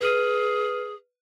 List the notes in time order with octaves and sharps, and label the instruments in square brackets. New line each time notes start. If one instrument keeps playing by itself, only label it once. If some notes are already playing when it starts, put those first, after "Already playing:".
[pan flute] G#4 [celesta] B4 F6 D#7